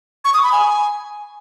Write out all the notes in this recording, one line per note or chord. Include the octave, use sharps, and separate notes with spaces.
C#6
D#6
B5
G#5